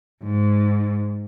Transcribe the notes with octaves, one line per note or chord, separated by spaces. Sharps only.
G#2